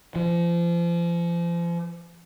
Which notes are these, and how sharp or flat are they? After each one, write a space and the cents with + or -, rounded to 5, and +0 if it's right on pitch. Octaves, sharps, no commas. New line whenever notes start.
F3 -35